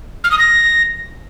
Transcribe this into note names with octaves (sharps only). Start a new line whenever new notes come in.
F6
D#6
A#6